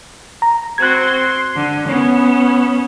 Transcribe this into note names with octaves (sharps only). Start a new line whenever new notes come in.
A#5
C4 F#4 C6 F#6 G#6
C6
D3
B3 C#4